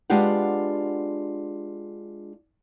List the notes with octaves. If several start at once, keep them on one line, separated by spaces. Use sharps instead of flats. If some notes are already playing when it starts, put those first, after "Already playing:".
G#3 B3 D4 F4 G4 F#5